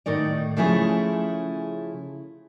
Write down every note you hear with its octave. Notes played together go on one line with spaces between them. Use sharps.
A2 D#3 D#4 D5
C#3 F3 A3 C#4 E4 G#4